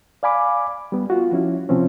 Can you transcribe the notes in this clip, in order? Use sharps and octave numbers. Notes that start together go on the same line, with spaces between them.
D5 F5 G#5 B5 D6
G3 B3
F4 F#4
F3 C#4 E4
C3 F3 C4 C#4